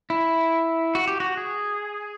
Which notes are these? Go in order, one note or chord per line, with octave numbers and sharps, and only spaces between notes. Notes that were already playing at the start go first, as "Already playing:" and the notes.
E4
F#4
G4
F#4
G#4